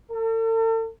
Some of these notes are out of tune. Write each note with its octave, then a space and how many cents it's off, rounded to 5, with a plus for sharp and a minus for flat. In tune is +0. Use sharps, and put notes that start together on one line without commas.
A4 +40